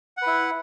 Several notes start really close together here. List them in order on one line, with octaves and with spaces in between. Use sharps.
F#5 B4 E4